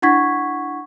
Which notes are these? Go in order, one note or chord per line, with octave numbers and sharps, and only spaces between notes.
D4 E4 F#5 C#6 G#6 B6